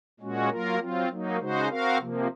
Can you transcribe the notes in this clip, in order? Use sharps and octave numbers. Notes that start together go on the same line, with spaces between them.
A#2 G#3 C#4 F#4
F#3 A#3 F4 A#4
F#3 C4 F4
F#3 A#3 D#4
C#3 G#3 D#4 F#4 C5
C4 F#4 A#4 F5
C3 F3 A#3